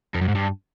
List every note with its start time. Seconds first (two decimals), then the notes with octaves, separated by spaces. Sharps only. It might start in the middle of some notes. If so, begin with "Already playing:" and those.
0.14 F2
0.21 F#2
0.28 G#2
0.35 G2